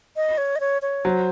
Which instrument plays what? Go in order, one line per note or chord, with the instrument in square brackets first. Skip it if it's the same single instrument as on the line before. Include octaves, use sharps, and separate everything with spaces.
[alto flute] D#5
C#5
D#5
C#5
C#5
[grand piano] F#3 [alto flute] C5